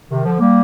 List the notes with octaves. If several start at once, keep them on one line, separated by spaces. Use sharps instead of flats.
C3 D#3
D3 F3
G3 A#3